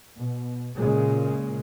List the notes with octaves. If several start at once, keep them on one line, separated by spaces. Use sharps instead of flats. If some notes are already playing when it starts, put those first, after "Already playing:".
B2
A#2 C#3 G#3